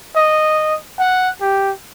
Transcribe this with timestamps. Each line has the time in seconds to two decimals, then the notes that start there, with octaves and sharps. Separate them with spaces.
0.16 D#5
0.99 F#5
1.41 G4